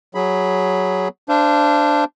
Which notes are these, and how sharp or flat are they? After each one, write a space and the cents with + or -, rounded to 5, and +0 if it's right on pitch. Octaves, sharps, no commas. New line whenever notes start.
F#3 +5 G#4 +0 B5 +0
D4 +0 C5 -15 F5 -40